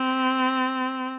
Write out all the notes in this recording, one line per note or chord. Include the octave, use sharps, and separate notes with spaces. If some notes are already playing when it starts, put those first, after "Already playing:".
Already playing: C4